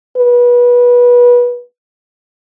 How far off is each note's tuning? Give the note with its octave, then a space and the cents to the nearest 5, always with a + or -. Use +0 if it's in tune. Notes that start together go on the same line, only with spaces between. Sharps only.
B4 -25